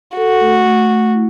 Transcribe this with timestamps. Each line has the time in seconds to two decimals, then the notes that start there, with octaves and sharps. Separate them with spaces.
0.17 F#4 A4
0.41 A3
0.65 A3
0.90 A3
1.14 E4